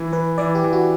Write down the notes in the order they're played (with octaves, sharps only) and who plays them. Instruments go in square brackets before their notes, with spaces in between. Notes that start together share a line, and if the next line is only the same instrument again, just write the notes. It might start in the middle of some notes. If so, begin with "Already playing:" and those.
Already playing: [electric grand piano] E3
[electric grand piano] E3 [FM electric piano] B4
[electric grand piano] E3 [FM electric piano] D5
[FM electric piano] G4
[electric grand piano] E3
[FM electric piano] F#4